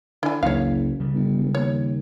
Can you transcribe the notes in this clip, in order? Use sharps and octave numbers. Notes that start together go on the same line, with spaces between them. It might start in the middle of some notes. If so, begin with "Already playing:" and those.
D3 E4 G#5
F#1 C#2 E3 C#5 F5
C#3 G3
G1
E1
D#2 C#5